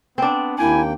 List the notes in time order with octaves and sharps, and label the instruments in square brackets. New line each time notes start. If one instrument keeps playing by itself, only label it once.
[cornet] B3 [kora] C4 D4
[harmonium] D#2 A#3 G5 [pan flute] E4 [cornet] G#5